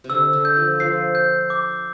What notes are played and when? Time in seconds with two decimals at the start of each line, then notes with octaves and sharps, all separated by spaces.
0.04 C3
0.10 D3 E6
0.33 D3
0.45 G6
0.56 F3
0.80 F3 C7
1.15 G6
1.50 D6